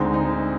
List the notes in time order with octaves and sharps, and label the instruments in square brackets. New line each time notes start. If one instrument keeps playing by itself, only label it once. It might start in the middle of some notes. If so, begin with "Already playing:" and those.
Already playing: [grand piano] D2 D3 G#3 C4 D#4
D#4